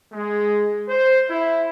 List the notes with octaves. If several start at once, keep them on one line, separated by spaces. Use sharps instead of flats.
G#3
C5
E4